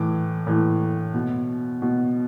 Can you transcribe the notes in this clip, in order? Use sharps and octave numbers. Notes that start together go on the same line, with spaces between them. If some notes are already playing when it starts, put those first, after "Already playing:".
Already playing: A2 E3 D6
A2 E3
B2
B2